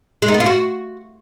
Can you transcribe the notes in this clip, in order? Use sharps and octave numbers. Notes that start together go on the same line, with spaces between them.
G#3
D#4
B3
F4
F#4